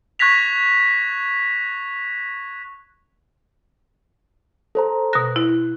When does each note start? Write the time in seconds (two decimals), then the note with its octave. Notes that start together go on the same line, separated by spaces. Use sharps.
0.19 C#6 F#6 G#6 A#6 B6 F7
4.75 A4 C5 A#5
5.13 B2 F#6 A#6
5.36 E4